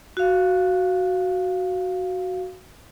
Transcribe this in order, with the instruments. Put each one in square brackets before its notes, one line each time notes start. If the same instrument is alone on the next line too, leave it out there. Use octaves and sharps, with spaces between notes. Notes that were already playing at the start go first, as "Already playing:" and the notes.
[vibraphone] F#4 F5